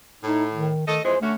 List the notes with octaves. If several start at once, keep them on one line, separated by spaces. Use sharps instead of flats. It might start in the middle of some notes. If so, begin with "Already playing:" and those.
A2 D#4
D#3
D#3 A3 A4 D#5
F2 E3 G#3 C5
D3 A3 C#4 F#4